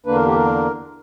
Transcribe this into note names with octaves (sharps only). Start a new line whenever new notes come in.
E2 D3 A#3 D4 B4
A#4
G4
A#4